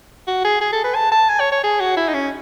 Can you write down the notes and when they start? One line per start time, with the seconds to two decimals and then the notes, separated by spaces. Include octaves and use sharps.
0.28 F#4
0.44 G#4
0.61 G#4
0.73 A4
0.84 B4
0.95 A5
1.12 A5
1.29 G#5
1.40 C#5
1.52 C#5
1.64 G#4
1.80 F#4
1.97 E4
2.09 D#4
2.14 C#4